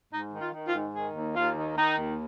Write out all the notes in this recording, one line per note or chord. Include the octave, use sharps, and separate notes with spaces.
G#2 D#4
D#3
F4
D#3
F4
G#2
D#3 G#4
D#2
D#2 F4
D#3
D#3 D#4
D#2